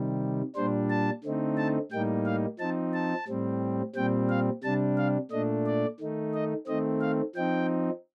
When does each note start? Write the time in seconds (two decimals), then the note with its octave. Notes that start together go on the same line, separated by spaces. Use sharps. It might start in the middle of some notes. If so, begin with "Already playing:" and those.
Already playing: C3 D#3 G3
0.56 A#2 G3 D4 C5
0.90 A5
1.24 D3 A3 C4 D#4
1.57 A5
1.91 A2 G3 A#3 D#4 G5
2.26 F5
2.59 F3 C4 D#4 A5
2.94 A5
3.28 A2 G3 C4
3.95 A#2 G3 C4 G5
4.30 F5
4.63 C3 G3 D4 A5
4.98 F5
5.31 A#2 A3 D4 D#5
5.66 D5
6.00 D#3 A3 D#4
6.34 D#5
6.67 D#3 A3 C4 D#5
7.01 F5
7.35 F3 C4 D#4 G5